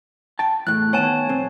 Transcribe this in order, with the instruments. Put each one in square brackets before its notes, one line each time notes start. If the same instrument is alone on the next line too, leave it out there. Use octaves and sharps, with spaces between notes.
[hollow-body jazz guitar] G5 A5
[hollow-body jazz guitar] E2 A2 [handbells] F#6
[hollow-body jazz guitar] D#3 B3 [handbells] C#5 G#5 A5
[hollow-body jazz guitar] B1 C4